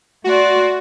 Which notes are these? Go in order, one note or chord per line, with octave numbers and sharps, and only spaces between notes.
A3 F#4 D5 C6